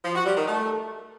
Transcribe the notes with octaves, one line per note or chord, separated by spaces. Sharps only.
F3
F#4
G3
D#3
A3